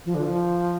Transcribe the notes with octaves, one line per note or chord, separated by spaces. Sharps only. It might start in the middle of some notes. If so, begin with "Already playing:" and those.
F3
D3
F3